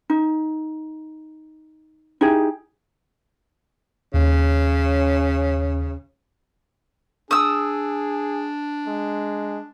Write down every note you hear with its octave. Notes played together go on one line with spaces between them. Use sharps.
D#4
D#4 E4 G4 G#4
D#2 C#3 C#4
D4 G#4 D#6 E6
G#3